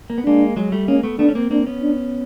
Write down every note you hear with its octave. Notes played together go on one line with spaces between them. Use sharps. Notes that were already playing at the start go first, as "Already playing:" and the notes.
A#3
B3
G#3 A#3 D4
F#3 G#3
G3 A3
G#3 A#3 C#4
A3 B3
A3 B3 D4
C#4
A#3 C4
A#3 C4 D4
B3 C#4
D4